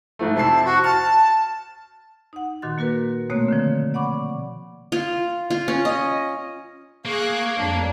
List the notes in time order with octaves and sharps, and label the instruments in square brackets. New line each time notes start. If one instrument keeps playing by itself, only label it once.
[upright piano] G#2 F3 A3
[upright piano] C3 E4 C7 [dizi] A5
[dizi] F#4 [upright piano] C5
[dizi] A5 [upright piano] F6
[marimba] D#4 F#5
A#2 D#3 F#4 C6 A6
A#3 F#4 A#4 B4
B2 A3 A#3 C4 C#5 F#6
D3 D#3 F3
D5 F#5 B5 C#6 D6
[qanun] F4
F4
C#4
D#5
[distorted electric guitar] A#3 [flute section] G#4 G#6 [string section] F5 C#6 F#6
[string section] F2 G3 D4 [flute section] C#5 A#5